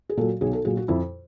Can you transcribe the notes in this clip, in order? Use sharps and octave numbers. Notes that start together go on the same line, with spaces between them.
G#4
A#2 F#3 A4
B1 G#4
A4
A#2 F#3 G#4
F#4
F2 E4